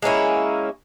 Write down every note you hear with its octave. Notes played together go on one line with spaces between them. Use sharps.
G#3 A#3 C#4 E4